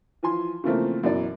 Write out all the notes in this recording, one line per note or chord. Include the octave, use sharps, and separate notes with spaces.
E3 F3 G#5 C6
C#3 E3 F3 A3 A#3 C4
F#2 B2 E3 F#4 D5